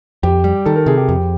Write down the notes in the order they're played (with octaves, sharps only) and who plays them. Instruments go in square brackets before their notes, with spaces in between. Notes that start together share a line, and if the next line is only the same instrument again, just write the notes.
[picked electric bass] F2 [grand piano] G4
[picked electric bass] G3
[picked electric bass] D#3 [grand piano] A4
[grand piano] A#4
[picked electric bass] C3 [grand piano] G#4
[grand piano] G4
[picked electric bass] F2 [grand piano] G4